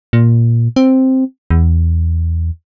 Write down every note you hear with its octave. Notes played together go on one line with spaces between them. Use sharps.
A#2
C4
E2